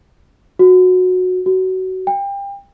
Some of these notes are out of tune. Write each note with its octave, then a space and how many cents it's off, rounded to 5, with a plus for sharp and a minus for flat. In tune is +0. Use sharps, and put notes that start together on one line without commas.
F#4 -15
F#4 +20
G5 +30